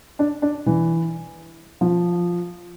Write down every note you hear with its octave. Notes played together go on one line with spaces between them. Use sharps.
D4
D4
E3
F3